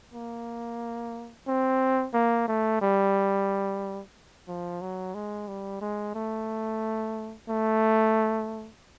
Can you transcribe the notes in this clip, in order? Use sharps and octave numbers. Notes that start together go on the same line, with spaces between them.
A#3
C4
A#3
A3
G3
F3
F#3
G#3
G3
G#3
A3
A3